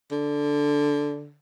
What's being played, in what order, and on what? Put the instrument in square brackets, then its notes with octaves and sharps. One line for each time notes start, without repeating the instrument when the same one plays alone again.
[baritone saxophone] D3